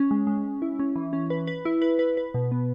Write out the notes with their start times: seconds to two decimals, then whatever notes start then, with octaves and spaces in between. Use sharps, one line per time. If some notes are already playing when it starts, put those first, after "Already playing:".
Already playing: C#4
0.11 G#3
0.27 G#3
0.44 G#3
0.62 E4
0.79 C#4
0.96 E3
1.13 C#4
1.30 B4
1.47 B4
1.65 E4
1.82 B4
1.99 B4
2.17 B4
2.34 B2
2.52 B3